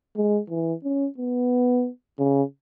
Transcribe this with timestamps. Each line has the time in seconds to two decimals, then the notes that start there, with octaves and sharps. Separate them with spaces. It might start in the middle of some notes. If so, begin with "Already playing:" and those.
0.16 G#3
0.50 E3
0.84 C#4
1.18 B3
2.19 C#3